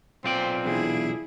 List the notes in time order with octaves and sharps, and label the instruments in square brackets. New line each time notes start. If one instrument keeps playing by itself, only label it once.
[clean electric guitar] B1 F4 D5 [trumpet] C4 [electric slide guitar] C5 G5
[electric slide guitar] E3 B3 D4 [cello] E4 G#4